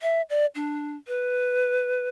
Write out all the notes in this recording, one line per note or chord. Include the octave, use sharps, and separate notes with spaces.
E5
D5
D4
B4